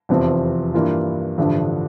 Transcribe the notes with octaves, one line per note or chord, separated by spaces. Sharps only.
F1 E2 C3 F3 C4
G2 E3 A#3 F4
A1 G2 D3 F3